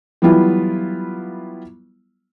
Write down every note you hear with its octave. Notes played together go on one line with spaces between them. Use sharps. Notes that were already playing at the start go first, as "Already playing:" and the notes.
E3 F#3 G3 B3 E4 F4